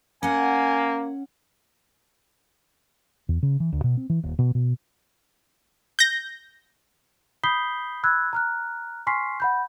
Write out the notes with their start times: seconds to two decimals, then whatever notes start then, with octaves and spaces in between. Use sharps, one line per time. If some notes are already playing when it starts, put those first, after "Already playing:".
0.23 A#3 C#4 F#5 G#5
3.29 E2
3.43 C#3
3.60 E3
3.73 D2
3.84 B2
3.97 C4
4.10 E3
4.23 D#1
4.39 B2
4.55 B2
5.99 G6 A#6
7.44 B5 D#6 G6 B6 C7 G7
8.04 B5 E6 F#6 G#6
8.33 A#5 F6 F#6
9.07 G#5 C6 C#6 F6 B6 C7
9.40 F#5 B5 G6